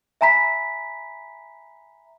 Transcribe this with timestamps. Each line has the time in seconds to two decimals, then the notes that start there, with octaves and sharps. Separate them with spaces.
0.21 E5 G#5 A#5 B5 B6